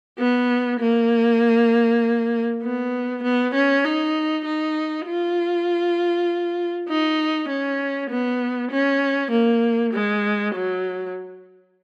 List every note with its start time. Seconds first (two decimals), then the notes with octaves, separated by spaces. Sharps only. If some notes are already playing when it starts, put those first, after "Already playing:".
0.18 B3
0.80 A#3
2.63 B3
3.23 B3
3.54 C#4
3.85 D#4
4.45 D#4
5.07 F4
6.88 D#4
7.49 C#4
8.10 B3
8.72 C#4
9.31 A#3
9.93 G#3
10.54 F#3